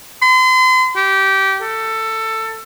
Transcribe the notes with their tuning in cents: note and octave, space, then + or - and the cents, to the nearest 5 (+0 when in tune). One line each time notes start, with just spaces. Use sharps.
C6 -40
G4 -20
A4 +15